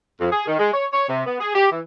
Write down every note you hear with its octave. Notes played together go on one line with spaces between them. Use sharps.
F2
G#4
D#3
G#3
C#5
C#5
C3
B3
G#4
G4
E3